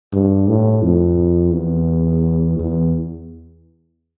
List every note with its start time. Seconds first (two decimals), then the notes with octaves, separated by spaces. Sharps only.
0.13 G2
0.48 A2
0.82 F2
1.53 E2
2.59 E2